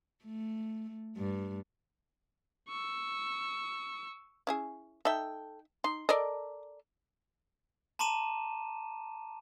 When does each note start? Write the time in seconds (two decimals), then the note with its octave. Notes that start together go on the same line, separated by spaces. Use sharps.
0.25 A3
1.17 G2
2.69 C#6 E6
4.47 C#4 E4 G#4
5.05 D#4 A4 E5 G5
5.84 D#4 C6
6.09 A4 A#4 D5 D#5
7.99 A5 A#5 C6 D6 D#7 E7